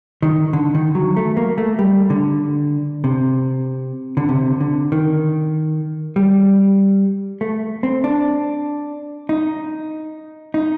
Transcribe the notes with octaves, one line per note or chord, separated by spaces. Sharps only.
D#3
D3
D#3
F#3
A3
A#3
A3
G3
D3
C3
D3
C3
D3
D#3
G3
A3
C4
D4
D#4
D#4